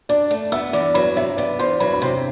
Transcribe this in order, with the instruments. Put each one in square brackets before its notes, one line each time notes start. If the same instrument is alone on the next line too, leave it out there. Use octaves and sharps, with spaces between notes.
[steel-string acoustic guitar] D4 [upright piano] D5 D6
[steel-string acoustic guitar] A3
[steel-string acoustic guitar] B3 [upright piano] E5 E6
[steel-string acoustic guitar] E2 [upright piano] D5 D6
[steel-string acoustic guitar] F#3 [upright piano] B4 B5
[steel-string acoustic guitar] C3 [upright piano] E5
[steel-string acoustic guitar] B3 [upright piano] D5
[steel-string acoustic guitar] E2 [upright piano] C5 C6
[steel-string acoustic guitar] F#3 [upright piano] B4 B5
[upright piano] B5
[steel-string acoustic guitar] C3 [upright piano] C5 C6